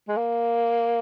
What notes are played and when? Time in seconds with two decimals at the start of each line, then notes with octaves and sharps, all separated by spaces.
0.08 G#3
0.17 A#3